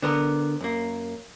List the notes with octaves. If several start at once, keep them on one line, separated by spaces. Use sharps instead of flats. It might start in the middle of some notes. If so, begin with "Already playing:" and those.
D3 B3 A#4
F#2 A#3